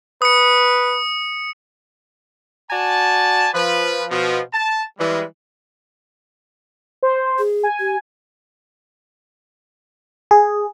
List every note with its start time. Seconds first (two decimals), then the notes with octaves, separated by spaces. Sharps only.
0.22 B4 D#6 C#7
2.70 F#4 D5 G#5 A5
3.54 F3 B4
4.10 B2 F3
4.52 A5
4.98 E3 G3 G#3
7.03 C5
7.39 G#4
7.63 G#5
7.80 G4
10.31 G#4